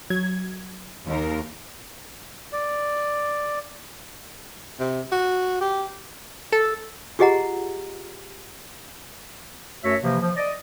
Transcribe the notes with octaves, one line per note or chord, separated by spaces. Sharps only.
F#3 G#6
D#2 A#4
D5
C3
F#4
G4
A4
F4 G4 G#4 D#5 F#5 A#5
F#2 A3 F#4 C#5 E5
C3 E3 F3 A#3
F3
D5 D#5